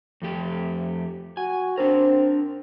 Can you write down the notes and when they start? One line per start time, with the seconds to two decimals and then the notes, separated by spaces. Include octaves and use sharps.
0.22 F2 A3 G4
1.37 F#4 G#5
1.78 C4 D4 A#4